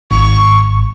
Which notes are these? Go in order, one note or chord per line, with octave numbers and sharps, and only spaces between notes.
G#1 C#6